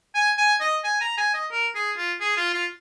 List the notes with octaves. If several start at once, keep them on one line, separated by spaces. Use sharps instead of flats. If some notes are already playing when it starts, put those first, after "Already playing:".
G#5
G#5
D#5
G#5
A#5
G#5
D#5
A#4
G#4
F4
G#4
F4
F4